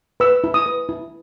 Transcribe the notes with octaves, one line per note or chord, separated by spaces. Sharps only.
B4 E6
E4
D#6
B4
E4